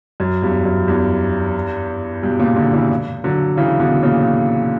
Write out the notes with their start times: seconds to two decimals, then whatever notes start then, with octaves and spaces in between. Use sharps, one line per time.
0.20 F#2
0.42 E2 G2
0.65 F#2
0.87 E2 G2
2.22 G2 B2
2.39 A#2 C#3
2.56 B2 D3
2.73 C#3 E3
3.24 D3 F#3
3.57 C#3 E3
3.80 B2 D3
4.03 A#2 C#3